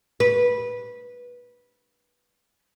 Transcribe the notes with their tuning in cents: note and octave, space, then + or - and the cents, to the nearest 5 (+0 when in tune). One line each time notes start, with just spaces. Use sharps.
B4 -15